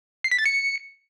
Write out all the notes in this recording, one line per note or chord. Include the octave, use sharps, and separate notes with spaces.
C7
B6
A6
C#7